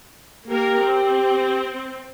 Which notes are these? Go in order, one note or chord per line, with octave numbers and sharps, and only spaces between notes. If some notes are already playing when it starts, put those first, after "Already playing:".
A#3 G4 A#4
C4